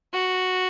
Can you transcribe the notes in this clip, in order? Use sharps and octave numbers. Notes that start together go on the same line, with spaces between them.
F#4